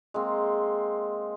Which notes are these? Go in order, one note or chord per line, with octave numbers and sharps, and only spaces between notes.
G#3 A#3 C4